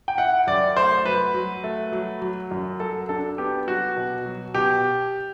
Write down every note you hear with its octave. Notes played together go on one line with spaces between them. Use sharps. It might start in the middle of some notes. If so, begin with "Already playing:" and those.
G5
E4 F#5
F#2 D5
A3 C5
F#3 B4
F#3
A3
F#3
F#3
F#2
F#3 A4
D4 A4
B3 G4
F#3 F#4
B2
F#3
B2 G4